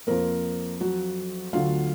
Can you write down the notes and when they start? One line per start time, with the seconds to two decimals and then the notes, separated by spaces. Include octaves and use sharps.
0.07 F2 F3 A#3 A#4
0.80 F#3 F#4
1.53 D2 D3 F#3 F4 F5